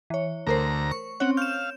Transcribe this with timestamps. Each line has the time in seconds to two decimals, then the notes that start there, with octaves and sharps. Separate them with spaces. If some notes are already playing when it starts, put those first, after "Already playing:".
0.10 E3 C#5
0.47 D2 A3 A#4 C5 A#5
0.91 C#6
1.20 C4 C#4 C#5 F#5
1.37 F5 G6 E7